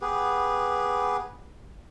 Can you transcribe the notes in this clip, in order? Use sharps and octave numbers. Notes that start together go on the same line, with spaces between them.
B3 G4 G#4 B4